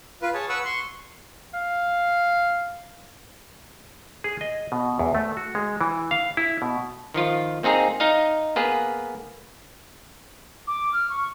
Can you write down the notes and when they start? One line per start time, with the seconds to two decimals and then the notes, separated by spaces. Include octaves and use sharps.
0.22 F4 B4
0.34 G#4 C#5 A5
0.49 B4 F#5 C#6 E6
0.65 C6 C#6
1.54 F5
4.24 G#4
4.41 D#5
4.72 B2
4.99 E2
5.15 A3
5.37 F#4
5.55 G#3
5.81 E3
6.11 F5
6.37 E4
6.62 B2
7.14 D#3 F3 F4
7.63 A#3 C4 D#4 G#4 A#5
8.00 D#4 D#5 F5
8.56 A#3 B3 G#4 B4
10.67 D6
10.93 F6
11.10 C#6